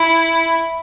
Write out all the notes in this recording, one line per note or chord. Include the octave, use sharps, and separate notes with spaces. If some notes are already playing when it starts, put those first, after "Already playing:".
Already playing: E4